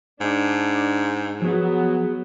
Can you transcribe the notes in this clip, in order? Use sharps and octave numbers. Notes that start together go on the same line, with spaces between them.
G#2 D4
F3 F#3 B3 G#4